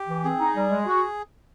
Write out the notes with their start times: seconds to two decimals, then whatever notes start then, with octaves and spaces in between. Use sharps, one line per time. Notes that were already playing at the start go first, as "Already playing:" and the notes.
Already playing: G4
0.08 E3
0.24 C4 G#4
0.39 D#4
0.55 G3
0.71 G#3
0.86 F#4